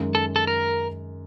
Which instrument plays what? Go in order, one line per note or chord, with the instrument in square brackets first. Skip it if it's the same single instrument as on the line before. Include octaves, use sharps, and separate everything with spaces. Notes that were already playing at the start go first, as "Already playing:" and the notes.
Already playing: [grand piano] F#2 D#3 G#3
[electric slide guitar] A4
A4
A#4